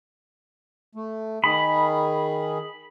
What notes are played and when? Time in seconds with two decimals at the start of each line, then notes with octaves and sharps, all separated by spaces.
0.95 A3
1.44 D#3 G#4 B5